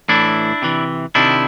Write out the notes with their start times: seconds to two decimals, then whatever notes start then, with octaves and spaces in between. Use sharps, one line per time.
0.09 A2 E3 D4 E4
0.62 C3 E3
1.15 C3 D#3 D4 E4